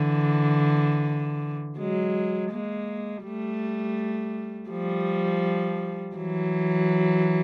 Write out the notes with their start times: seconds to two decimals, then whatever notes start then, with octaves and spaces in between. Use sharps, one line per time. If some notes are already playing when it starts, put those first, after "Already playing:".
Already playing: D3 E3
1.78 F#3 G#3
2.51 G#3 A#3
3.24 G3 A3
4.70 F3 G3
6.16 E3 F#3